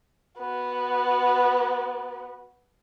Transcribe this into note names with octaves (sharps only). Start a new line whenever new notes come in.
B3 F#4